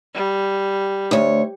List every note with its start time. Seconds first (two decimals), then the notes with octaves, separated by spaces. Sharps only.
0.14 G3
1.11 D2 C#5